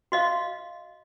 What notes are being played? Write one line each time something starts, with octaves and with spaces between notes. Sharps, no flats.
F#4 D#5 F5